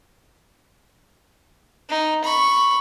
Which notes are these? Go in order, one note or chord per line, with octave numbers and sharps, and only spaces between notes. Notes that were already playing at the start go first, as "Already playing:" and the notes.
D#4
B5 C#6